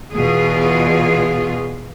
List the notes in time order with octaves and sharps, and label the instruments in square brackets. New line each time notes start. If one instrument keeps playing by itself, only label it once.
[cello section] E2 B2 F4 G#4